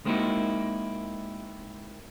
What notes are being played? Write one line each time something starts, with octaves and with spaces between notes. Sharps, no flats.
G#3 A#3 C4 D#4 E4 F#4